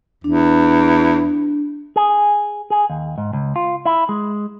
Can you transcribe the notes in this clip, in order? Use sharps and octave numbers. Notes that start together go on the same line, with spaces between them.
E2 D4
G#4
G#4
D#2
G#2
C#2
F4
E4
G#3